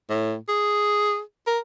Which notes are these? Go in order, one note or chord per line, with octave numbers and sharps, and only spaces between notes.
A2
G#4
A#4